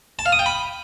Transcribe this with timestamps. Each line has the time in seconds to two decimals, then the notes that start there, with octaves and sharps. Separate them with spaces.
0.19 A5
0.26 F5
0.32 D#6
0.39 G5
0.46 B5